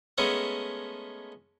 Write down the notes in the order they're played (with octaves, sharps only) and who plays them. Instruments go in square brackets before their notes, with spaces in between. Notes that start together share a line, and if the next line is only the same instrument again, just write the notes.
[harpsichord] G#3 A3 B3 C#4 A4 A#4